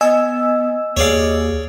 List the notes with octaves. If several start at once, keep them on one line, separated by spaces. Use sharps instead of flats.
B3 D#5 G#5 E6
D#2 G#4 C#5 D5 F5